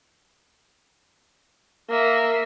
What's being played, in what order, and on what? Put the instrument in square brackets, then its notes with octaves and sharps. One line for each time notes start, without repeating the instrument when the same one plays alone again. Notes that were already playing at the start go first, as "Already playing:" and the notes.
[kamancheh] A#3 E5